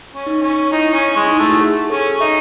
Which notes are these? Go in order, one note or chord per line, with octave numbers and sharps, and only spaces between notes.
C#4
D#4
C#4
D#4 E4
C#4
G#3
D#4
A3 E4
F#4
G#4
C#4 A4
D#4 E5